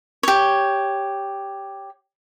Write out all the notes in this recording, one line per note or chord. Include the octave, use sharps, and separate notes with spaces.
G4 C#5